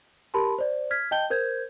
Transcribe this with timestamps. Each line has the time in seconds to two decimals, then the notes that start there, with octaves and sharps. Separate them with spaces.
0.34 G4 A#4 A5 B5 C6
0.58 C5 D5
0.91 F6 G#6 B6
1.11 D#5 G5 A5 G6 G7
1.30 A#4 C5 G6 G#6